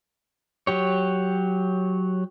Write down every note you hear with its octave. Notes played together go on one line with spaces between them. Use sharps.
F#3 G4 C#5